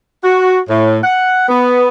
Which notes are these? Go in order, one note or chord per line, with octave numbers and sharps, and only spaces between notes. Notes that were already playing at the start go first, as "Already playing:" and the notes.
F#4
A2
F#5
B3